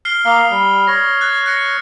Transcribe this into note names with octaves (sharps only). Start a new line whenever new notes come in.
F6 C7 G7
A#3 F5 D#6 G7
G3
C#5 A#6
F#6 A6
F#6 A#6 C#7